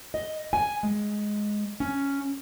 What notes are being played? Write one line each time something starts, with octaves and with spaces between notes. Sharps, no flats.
D#5
G#5
G#3
C#4